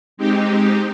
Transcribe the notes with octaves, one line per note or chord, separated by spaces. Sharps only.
G#3 C4 D#4 G4